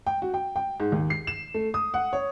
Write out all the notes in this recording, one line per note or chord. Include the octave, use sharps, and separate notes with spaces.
G5
F#4
G5
G5
G#2
D#2
C7
E7
A3
D#6
F#5
C#5